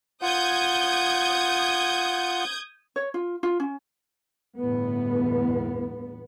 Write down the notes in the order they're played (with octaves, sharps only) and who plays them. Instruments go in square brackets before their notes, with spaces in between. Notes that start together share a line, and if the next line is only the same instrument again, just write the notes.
[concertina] F4 F#5 [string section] D#6 G6 G#6
[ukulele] C#5
F4
F4
C#4
[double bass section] G1 E2 A2 B3